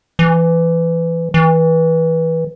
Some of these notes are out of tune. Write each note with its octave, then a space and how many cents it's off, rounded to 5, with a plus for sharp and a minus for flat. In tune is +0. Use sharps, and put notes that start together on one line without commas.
E3 +20
E3 -20